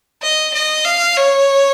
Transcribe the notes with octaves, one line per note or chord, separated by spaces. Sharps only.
D#5
D#5
F5
C#5